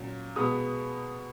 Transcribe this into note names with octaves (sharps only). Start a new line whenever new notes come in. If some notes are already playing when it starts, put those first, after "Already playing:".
Already playing: A#2 F#3 C#4
B2 G#3 B3 D#6